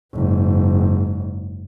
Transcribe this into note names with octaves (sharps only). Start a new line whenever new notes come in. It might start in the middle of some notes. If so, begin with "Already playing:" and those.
F#1 G#2